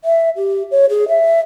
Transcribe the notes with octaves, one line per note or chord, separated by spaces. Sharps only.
E5
G4
C#5
G#4
E5